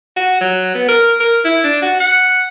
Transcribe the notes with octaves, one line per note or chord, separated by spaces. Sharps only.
F#4
F#3
B3
A#4
A#4
E4
D4
F#4
F#5